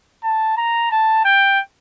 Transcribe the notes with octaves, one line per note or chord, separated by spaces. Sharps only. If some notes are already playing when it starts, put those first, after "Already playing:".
A5
A#5
A5
G5